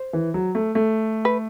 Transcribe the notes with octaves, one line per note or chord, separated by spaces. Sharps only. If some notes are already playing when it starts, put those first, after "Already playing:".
Already playing: C5
E3
F#3
A3
A3
B4